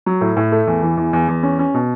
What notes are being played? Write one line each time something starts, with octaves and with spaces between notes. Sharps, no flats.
F#3
A2
A2
A3
E2
E3
E2
E2
E2
C#4
C#4
B2